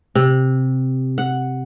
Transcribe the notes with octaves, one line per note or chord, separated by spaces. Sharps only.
C3
F#5